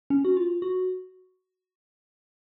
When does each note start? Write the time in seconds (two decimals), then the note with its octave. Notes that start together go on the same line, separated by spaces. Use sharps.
0.10 C#4
0.25 F#4
0.37 F4
0.62 F#4